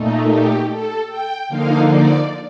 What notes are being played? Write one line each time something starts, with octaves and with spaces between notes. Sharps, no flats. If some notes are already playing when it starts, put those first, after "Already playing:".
Already playing: A#2 A3 D#4
G4
A4
G5
D3 F3 A#3 D#4 F5
D5